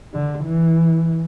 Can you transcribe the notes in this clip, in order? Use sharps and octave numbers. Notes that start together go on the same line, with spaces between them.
D3
E3